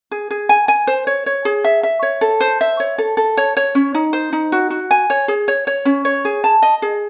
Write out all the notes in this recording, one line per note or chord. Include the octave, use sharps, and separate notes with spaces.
G#4
G#4
G#5
G#5
C5
C#5
C#5
G#4
E5
E5
C#5
A4
C5
E5
C#5
A4
A4
C#5
C#5
C#4
D#4
C5
D#4
F#4
F#4
G#5
C#5
G#4
C#5
C#5
C#4
C#5
G#4
A5
D#5
G#4